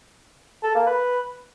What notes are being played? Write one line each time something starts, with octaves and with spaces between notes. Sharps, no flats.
A4
A#3
B4